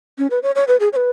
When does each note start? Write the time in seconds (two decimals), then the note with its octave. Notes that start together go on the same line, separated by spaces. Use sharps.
0.18 C#4
0.30 B4
0.43 C#5
0.55 C#5
0.68 B4
0.80 G#4
0.93 C#5
0.96 B4